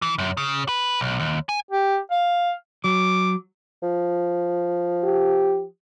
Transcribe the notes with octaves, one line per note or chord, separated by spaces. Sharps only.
E3
F#2
C#3
B4
B1
D#2
G#5
G4
F5
F#3 D6
F3
G4